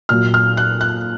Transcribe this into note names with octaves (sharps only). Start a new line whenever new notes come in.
A#2 F#3 F6
F6
F#6
F#6